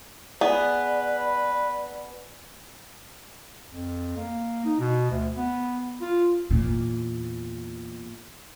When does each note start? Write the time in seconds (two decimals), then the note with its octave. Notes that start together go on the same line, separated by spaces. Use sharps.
0.41 B3 G#4 B4 D5
3.69 F2
4.17 A#3
4.65 D#4
4.79 B2
5.11 D2
5.37 B3
6.01 F4
6.51 E2 A#2